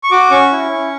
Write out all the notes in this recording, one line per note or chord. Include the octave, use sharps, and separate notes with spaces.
C#6
F#4 D6
C#4 C#6
E4
C#4